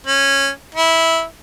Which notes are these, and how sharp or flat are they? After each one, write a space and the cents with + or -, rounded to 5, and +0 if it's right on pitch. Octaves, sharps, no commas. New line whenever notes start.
C#4 -15
E4 -10